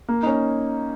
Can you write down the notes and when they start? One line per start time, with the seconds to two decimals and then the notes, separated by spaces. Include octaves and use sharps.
0.09 A#3
0.23 D#4
0.26 C#4